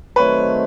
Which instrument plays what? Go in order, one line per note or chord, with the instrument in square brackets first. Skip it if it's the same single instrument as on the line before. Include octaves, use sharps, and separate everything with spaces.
[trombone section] D#3 F#3 A3 C4 [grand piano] B4 C#5